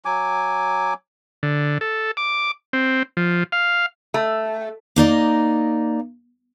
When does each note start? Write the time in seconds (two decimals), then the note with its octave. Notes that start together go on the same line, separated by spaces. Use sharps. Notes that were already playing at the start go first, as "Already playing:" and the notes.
0.05 F#3 G#5 D6
1.43 D3
1.81 A4
2.17 D6
2.73 C4
3.17 F3
3.52 F5
4.14 A3
4.96 A#3 D#4 D5 D#5